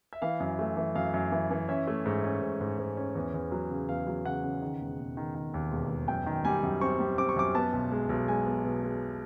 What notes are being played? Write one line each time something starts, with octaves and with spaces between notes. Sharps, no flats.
E5
E3 F5
F#2
A3
E3
F#2 F5
F#2
E3
E3
C#4 E5
A3
G#2
C#4
G#2
G#2
G#2
C#4
E2
E2
F#3
C#3
E2 F5
F#3
C#3 F#5
C#3
D#3
E1
E1
D#3
D#3
D#2
E1
E1
F#2 G5
D#3
G3 G#5
F#2
C4 C#6
G3
C4 D6
C#6
F#2 D6
B3 A5
B1
G#3
B1
G#3 G#5
B3
B2
G#3